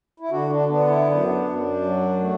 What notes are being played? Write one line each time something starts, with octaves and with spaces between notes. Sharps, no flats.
E4
D3 D4 F#4
D4
B3 D4
E4
F#2 D4
F#2
F#3
A3